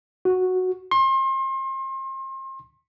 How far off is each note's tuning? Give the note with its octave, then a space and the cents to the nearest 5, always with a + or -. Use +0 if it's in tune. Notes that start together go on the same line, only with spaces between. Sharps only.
F#4 -5
C6 +35